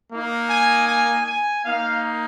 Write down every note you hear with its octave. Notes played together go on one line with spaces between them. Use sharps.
A#3 D#4
G#5
G#5
G#5
A#3 D#4 F5